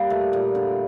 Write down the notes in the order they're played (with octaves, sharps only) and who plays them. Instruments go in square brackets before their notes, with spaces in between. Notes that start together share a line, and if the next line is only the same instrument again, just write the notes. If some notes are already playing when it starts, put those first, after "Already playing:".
Already playing: [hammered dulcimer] G3 A#3
A3
A#2
D3